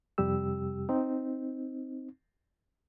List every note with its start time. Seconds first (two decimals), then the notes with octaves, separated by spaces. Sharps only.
0.18 F2 C3 G3 G4 E6
0.89 C4 D#4